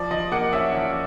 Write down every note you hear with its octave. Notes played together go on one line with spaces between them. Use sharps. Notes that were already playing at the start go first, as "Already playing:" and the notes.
Already playing: F3 D5
F3 D#5
A#3 F#5
C#4 E5
F3